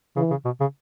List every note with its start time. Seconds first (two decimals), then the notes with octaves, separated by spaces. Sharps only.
0.16 C#3 E3
0.30 C#3
0.45 B2
0.60 C#3